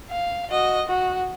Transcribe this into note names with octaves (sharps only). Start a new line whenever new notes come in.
F5
F#4 D#5
F#4